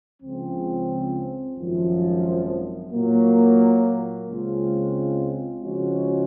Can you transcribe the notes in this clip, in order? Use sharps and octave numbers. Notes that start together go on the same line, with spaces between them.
C#2 C#3 F3 C4
G#1 F#2 F3
A#2 F#3 A#3
C#2 C#3 G#3 C4 F4
C#3 F3 G#3 C#4 F#4